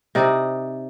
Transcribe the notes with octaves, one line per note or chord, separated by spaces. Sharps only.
C3 D#4 D5